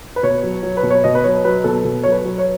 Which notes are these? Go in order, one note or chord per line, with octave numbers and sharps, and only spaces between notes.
B4
B2 C#5
F#3
F#3
B4
B2
C#5
B2 D#5
B4
F#3 C#5
F#3 B4
B2 A4
B2
F#3 C#5
B4
F#3
C#5